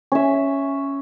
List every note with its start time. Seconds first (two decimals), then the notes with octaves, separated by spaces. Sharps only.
0.12 C#4 E5